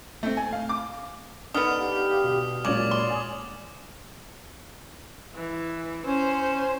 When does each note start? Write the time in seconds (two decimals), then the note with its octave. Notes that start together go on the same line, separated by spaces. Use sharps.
0.23 A3 C4
0.37 G#5
0.53 F5
0.69 D6
1.54 D3 B3 D#4 D#6 F6 F7
1.78 G4 F5
2.24 B2
2.65 A#2 C#3 F#3 G#3 C#5 D5 D6 F#7
2.91 C6
3.10 G#5 D#6
5.34 E3
6.06 C#4 C5